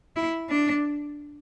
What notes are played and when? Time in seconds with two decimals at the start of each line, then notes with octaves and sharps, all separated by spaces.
0.16 E4
0.49 D4